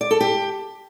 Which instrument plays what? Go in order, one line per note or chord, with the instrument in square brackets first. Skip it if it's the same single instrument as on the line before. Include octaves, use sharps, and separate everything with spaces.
[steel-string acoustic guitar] D5
A4
G4